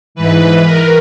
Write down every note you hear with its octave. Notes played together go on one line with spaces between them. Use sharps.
G#2 E3 B4
A#4